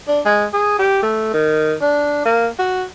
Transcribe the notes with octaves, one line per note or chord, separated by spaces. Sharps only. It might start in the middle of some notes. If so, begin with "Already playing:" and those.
D4
G#3
G#4
G4
A3
D#3
D4
A#3
F#4